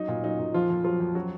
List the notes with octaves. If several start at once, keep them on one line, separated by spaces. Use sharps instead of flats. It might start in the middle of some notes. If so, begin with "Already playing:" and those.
Already playing: F#3 D#4
A#2
F#3 D#4
A#2
F2 F3 F4
F2
F3 F#3 F4
F2
F#3 F#4